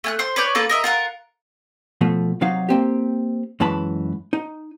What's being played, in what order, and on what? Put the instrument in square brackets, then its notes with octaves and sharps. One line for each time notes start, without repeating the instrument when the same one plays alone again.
[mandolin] A3 G#5 F#6
C5 C6
B4 C#5 D5 G6
A#3 F4 A4 B4
A#4 D#5 E5
F4 A#4 F#5
[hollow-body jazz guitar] B2 F3 A3
C3 F#3 D#4 F5
A#3 C4 G4
F#2 E3 G#3 A5 B5
D#4